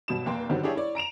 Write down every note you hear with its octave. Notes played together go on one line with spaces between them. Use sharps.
G2 B2 F#3 E7
F1 A#3 G5 C6
G2 D3 D#3 F#3 G3 C4
D4 E4 G4 G#4 C#5 E5
E4 C#5 D5
A#5 D7 E7 F7